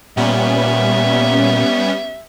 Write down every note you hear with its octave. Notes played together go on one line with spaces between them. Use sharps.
A#2 G3 B3 C#4 E5